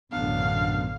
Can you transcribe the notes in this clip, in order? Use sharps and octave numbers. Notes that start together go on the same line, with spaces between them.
A1 F#2 B2 D3 F#3 B3 D4 F5